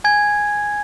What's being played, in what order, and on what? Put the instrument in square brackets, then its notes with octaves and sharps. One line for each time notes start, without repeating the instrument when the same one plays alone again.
[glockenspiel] G#5 G#6